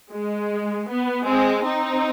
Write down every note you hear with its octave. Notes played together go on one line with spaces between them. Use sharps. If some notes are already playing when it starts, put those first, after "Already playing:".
G#3
B3
G#3 C4
C4 D#4